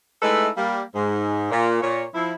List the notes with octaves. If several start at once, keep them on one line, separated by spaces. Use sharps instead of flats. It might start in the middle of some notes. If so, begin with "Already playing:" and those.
G#3 A3 D#4 E4 A4 B4
G3 A#3
G#2
A#2
A#2 C#5
F3 E4